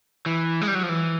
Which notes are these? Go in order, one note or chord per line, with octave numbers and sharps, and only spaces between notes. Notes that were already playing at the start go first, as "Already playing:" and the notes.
E3
G#3
G3
F#3
F3
E3